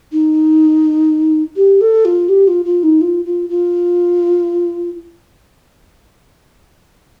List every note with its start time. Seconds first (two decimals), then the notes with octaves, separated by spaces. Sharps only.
0.12 D#4
1.56 G4
1.81 A4
2.05 F4
2.29 G4
2.48 F4
2.65 F4
2.83 D#4
3.01 F4
3.25 F4
3.49 F4